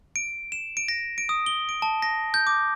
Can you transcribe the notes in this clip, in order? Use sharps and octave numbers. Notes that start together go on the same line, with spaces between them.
D7
E7
D7
A#6
D7
D#6
G7
D7
A5
A#6
G6
D6